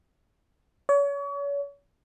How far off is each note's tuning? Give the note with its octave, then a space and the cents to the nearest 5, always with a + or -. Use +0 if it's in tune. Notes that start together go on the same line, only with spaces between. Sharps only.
C#5 +35